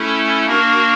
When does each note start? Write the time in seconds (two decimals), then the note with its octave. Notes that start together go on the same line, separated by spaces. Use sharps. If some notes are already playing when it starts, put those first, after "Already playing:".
Already playing: A3 C#4 E4 A4
0.46 A#3 D4 F#4 A#4